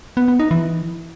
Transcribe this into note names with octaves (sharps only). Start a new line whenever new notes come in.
B3
B3
D#4
E3